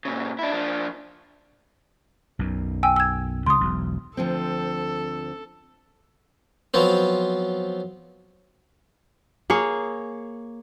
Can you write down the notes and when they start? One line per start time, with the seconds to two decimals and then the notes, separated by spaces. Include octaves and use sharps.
0.05 A#2 C#3
0.39 D4 E4
0.51 F3 D4
2.39 B1 F#2 B2
2.83 G5 G#5 E6
2.96 E6 G#6
3.46 C#2 C#3 C6 D#6
3.61 E1 B1
4.17 D2 F3 C4 A4
6.74 F3 F#3 B3 C4
9.50 A#3 G#4 C#5